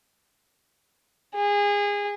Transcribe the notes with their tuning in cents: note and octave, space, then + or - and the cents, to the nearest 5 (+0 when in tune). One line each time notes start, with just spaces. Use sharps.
G#4 -25